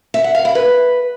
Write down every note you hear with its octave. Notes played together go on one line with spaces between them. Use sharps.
E5
F#5
F5
E4
B4